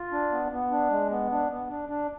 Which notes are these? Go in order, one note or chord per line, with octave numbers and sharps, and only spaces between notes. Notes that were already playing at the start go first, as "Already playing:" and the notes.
Already playing: F4
D4
B3
B3
D4
G#3
B3
D4
B3
D4
D4